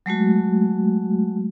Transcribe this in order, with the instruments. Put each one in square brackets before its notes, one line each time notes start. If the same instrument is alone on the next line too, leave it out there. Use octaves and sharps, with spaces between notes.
[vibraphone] F#3 G#3 A3 F#4